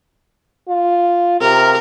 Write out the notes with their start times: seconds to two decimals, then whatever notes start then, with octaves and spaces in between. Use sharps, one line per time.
0.68 F4
1.41 C3 A#4